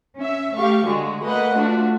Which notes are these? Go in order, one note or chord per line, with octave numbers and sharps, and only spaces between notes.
C#4 E5
A3 G4 F5 C#6
D3 G#3 F#4
A3 A#3 B4 D#5 F#5
A3 D4 F4 F#4